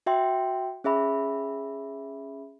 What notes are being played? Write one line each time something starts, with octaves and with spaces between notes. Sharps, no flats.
F#4 E5 G5 C6
C#4 G#4 E5 B5